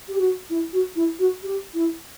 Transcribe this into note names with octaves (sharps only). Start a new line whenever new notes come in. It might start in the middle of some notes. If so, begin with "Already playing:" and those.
G4
F#4
E4
F#4
E4
F#4
G4
E4